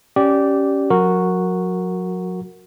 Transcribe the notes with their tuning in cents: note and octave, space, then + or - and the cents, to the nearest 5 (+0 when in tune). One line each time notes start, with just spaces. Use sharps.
C#4 +5 G4 -15 D5 +0
F#3 -40 F#4 -5 A#4 -10